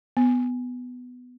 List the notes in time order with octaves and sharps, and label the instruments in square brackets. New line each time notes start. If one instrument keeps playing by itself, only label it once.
[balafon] B3